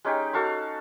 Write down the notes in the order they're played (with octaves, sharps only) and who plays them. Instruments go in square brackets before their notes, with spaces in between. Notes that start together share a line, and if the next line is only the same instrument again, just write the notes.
[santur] G#3 C#4 D#4 G4
F#4 A4 F5 C#6